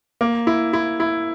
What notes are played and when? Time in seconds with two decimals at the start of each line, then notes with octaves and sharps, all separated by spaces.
0.21 A#3
0.47 E4
0.73 E4
1.00 E4